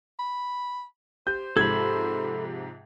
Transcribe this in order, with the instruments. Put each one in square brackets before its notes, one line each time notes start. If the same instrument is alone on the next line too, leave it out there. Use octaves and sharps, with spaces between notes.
[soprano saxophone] B5
[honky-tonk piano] G4 [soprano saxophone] C5 [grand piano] G6
[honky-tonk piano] G#2 C3 F3 [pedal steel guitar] A4 B5 [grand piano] G#6